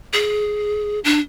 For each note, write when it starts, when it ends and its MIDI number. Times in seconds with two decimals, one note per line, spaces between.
0.13 0.99 68
1.04 1.19 62